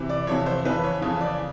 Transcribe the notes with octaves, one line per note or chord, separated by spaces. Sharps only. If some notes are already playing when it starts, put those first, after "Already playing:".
Already playing: C3 E3
D5
F2 C3 E3 C#5
C5
F2 C#3 E3 B4
C#5
F2 C#3 E3 C#5
D5